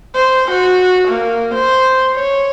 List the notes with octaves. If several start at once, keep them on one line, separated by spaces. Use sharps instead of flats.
C5
F#4
A#3
C5
C#5